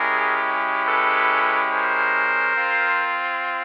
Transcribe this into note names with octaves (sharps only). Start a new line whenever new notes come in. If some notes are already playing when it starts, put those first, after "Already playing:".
Already playing: G#3 C#4 E4 G4 G#4 A#4
A4 B4
A#4 C5
C4 F4